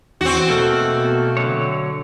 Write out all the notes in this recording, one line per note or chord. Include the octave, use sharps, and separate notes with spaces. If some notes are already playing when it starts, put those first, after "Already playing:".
E2 C4 F#4
B2 A3 A#3 A4
D3 F#3 C#5